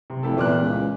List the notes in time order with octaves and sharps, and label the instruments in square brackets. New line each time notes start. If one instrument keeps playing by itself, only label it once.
[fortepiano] C3
[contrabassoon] F1 [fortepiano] E4 G4 A4
[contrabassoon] E2 [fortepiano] A#2 D6 F#6
[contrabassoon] C#2